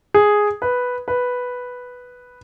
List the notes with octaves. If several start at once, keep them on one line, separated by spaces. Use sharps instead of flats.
G#4
B4
B4